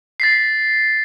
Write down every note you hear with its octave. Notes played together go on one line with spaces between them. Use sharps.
A6 B6 C7